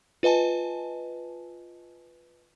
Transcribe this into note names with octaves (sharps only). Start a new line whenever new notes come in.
F4 B4 D#5 G#5 A5